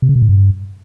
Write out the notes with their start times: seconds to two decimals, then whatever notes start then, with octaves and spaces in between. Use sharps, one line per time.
0.02 C3
0.09 C#3
0.16 B2
0.22 A2
0.29 G2